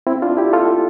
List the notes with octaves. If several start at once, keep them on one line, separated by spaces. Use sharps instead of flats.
C4 E4
D4 F4
E4 G4
F4 A4